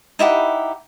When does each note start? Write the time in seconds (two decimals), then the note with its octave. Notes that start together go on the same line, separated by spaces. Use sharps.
0.19 D#4 E4 G4 F#5